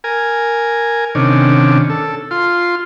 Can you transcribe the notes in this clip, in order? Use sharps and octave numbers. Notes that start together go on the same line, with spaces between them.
A#4 G#5
C3 D#3 C#4 D4
A4
F4 C6